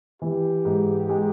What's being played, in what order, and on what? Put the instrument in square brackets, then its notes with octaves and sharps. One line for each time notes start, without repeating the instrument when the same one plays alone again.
[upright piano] E3 [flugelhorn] G4
[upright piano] G#2
G#3